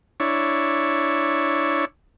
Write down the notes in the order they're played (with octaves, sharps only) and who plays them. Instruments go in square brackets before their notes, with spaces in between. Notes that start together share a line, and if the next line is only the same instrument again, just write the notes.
[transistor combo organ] D4 E4 C#5